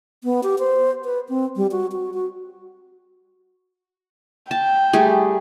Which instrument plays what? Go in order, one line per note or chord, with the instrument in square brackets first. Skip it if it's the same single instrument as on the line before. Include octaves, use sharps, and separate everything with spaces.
[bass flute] B3
G4
C5
B4
C4
G3
F#4
F#4
F#4
[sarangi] G5 [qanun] A5
[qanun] G3 A3 G#4